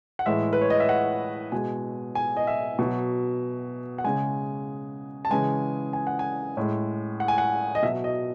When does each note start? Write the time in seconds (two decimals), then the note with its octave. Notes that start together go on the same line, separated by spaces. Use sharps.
0.19 F#5
0.26 A2 E3 G#3 E5
0.53 B4
0.61 C#5
0.70 D#5
0.80 E5
0.89 F#5
1.52 B2 G#3 G#5
2.15 G#5
2.37 D#5
2.47 E5
2.79 B2 F#3
3.98 F#5
4.04 C#3 G#3 G#5
5.25 A5
5.31 C#3 E3 G#3 G#5
5.93 G#5
6.07 F#5
6.19 G#5
6.57 A2 G#3
7.20 F#5
7.28 G#5
7.38 F#5
7.75 D#5
7.82 B2 F#3 E5
8.04 D#5